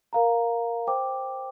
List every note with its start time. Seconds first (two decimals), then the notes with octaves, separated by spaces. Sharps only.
0.13 A#4 F5 A#5
0.87 C5 G5 D6